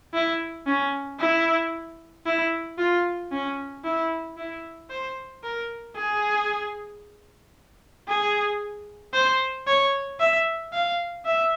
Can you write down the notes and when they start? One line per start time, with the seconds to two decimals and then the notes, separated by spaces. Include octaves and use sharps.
0.14 E4
0.66 C#4
1.20 E4
2.26 E4
2.78 F4
3.32 C#4
3.84 E4
4.38 E4
4.90 C5
5.43 A#4
5.96 G#4
8.08 G#4
9.14 C5
9.67 C#5
10.20 E5
10.73 F5
11.25 E5